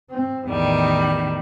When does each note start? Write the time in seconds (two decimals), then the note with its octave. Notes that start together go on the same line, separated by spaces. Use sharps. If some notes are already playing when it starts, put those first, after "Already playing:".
0.11 C4
0.48 A1 E2 D#3 G3